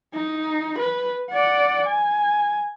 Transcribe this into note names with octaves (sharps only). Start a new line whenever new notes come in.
D#4
B4
D5 F#5
G#5